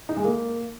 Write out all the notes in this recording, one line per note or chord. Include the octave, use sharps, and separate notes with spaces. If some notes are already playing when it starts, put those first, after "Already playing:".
D#4
G#3
A#3